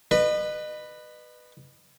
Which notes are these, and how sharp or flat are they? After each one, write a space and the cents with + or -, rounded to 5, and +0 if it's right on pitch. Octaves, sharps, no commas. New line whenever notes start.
B4 +0 D#5 -35